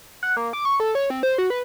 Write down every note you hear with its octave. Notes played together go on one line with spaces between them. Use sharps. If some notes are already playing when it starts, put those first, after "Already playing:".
F#5
A#3
D6
C#6
A4
C#5
C4
C5
F#4
B4